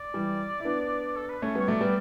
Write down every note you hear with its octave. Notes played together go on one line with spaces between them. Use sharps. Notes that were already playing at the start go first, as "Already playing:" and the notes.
Already playing: D5
E3 G3
E4
B3 D4
A4
B4
A3 C#4 C#5
G3 B3
C#5
F#3 A3 D5
G3 B3